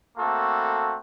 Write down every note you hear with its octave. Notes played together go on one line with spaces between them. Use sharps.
A3 A#3 C4 F#4 A4